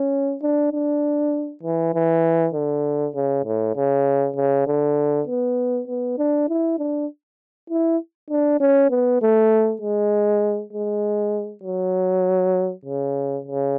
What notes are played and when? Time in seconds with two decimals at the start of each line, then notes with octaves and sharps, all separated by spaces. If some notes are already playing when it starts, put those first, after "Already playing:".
Already playing: C#4
0.42 D4
0.73 D4
1.63 E3
1.94 E3
2.54 D3
3.15 C#3
3.45 A2
3.76 C#3
4.36 C#3
4.67 D3
5.27 B3
5.88 B3
6.18 D4
6.49 E4
6.79 D4
7.70 E4
8.30 D4
8.60 C#4
8.90 B3
9.22 A3
9.81 G#3
10.73 G#3
11.63 F#3
12.85 C#3
13.45 C#3